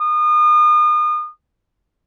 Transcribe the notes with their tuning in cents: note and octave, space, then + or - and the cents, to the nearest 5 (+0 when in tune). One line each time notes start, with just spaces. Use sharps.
D#6 -35